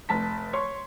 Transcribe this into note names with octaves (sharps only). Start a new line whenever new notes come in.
F1 A5 B6
C#5 C6 C#6